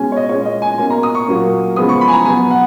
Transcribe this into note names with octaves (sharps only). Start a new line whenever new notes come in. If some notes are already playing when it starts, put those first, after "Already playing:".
Already playing: B2 G#3 C#4 G#5
C#5
D#5
A#2 G#3 C#4 C#5
D#5
G#5
B2 A#3 C#4 G#5
A#5
D#6
C#6
A#2 F#3 A#3 C#4
C#3 F3 G#3 B3 D#6
C#6
B5
G#5
A#5
B2 F#3 B3 G#5
F#5